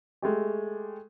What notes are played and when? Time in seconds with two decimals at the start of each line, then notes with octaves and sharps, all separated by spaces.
0.22 G#3 A3 G4